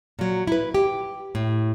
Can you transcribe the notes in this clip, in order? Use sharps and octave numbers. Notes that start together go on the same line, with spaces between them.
A#2 F#3
E4 B4
G4
A2